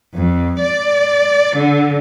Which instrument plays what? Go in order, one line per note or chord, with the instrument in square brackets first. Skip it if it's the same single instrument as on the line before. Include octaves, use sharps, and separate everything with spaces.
[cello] F2
D5
D3